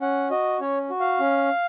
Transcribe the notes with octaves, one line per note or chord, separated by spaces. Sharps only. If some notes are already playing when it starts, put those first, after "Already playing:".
C#4 F#5
F#4 D#5
C#4 C#5
F#4
F5
C#4